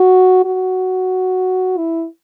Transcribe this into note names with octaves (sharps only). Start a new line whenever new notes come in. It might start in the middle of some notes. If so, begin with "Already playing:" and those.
Already playing: F#4
F#4
E4